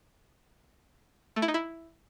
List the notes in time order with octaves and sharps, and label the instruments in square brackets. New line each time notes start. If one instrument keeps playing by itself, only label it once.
[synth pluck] A3
E4
D#4
E4